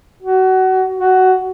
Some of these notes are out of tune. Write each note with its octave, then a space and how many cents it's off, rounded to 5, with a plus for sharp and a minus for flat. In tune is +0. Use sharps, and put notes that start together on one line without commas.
F#4 +25
F#4 +15